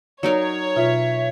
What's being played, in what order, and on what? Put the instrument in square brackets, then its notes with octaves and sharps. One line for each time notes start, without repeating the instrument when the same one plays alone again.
[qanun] F#3 D#4 A#4 [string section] C#5 [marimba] D5
[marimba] B2 F4 [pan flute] E5